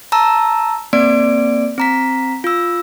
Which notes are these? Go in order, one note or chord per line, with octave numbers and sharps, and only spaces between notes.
A5 A#5 E6
A#3 C4 D5 D7
C4 A#5 B6
F4 E6